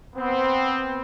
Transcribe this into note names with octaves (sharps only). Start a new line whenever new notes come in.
B3 C4